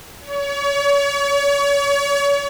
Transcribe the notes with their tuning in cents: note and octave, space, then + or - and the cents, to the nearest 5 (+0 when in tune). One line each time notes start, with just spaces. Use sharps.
C#5 +35